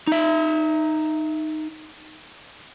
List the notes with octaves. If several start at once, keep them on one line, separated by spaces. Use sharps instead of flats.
D#4 E5